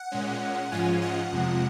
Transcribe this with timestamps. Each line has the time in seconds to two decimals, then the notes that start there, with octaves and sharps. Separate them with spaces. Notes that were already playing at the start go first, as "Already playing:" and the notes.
Already playing: F#5
0.12 A#2 G#3 C#4
0.72 G#2 F3 G#3 C#4 F4 G#5
1.02 F#5
1.32 F2 C3 F3 G#3